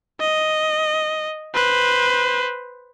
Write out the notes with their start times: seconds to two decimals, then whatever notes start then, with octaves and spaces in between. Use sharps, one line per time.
0.20 D#5
1.55 B4 C5